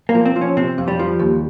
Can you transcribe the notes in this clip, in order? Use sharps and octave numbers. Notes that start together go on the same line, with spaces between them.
A#3
F3
C4
F3
C#4
C3 C4
F2
G3
F3
D#2